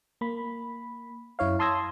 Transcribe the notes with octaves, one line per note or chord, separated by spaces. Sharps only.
A#3 B5
F#2 E4 C#5 F5
A5 C6 D#6 E6 G#6 A#6